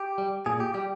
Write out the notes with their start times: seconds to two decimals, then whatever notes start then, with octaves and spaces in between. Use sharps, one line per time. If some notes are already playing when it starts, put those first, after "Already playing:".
Already playing: G4
0.18 G3
0.46 A#2 G#4
0.60 G4
0.74 G3 G4